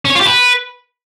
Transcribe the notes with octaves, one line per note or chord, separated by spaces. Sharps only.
C#4
C#5
F4
G4
B4